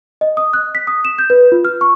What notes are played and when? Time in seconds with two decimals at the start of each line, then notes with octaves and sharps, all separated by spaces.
0.21 D#5
0.37 D#6
0.53 F#6
0.75 B6
0.87 D#6
1.05 E7
1.19 G6
1.30 B4
1.52 F4
1.65 F6
1.81 C#6